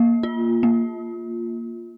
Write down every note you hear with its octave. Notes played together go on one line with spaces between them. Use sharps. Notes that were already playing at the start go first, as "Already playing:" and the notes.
Already playing: A#3
F4
A#3